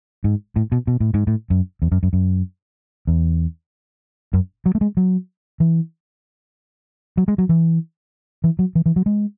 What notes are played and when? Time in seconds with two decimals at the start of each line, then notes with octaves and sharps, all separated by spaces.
0.24 G#2
0.56 A2
0.72 B2
0.87 B2
1.00 A2
1.14 G#2
1.27 A2
1.50 F#2
1.82 E2
1.92 F#2
2.03 F#2
2.13 F#2
3.07 E2
4.33 F#2
4.66 F#3
4.75 A3
4.81 G#3
4.97 F#3
5.60 E3
7.17 F#3
7.28 G#3
7.38 F#3
7.49 E3
8.44 E3
8.59 F#3
8.75 E3
8.86 E3
8.96 F#3
9.06 G#3